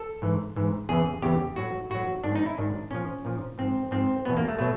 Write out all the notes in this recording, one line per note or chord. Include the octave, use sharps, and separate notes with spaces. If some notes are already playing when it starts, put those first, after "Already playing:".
Already playing: A4
G#2 E3
G#2 E3
E2 C#3 E3 G#4
E2 C#3 E3 G4
A2 F#3 F#4
A2 F#3 F#4
G#2 D#3 F#3 D4
D#4
E4
G#2 D#3 F#3 D4
A#2 F3 C#4
A#2 F3
G#2 F3 C4
G#2 F3 C4
E2 B2 F#3 B3
A#3
A3
B2 F#3 A3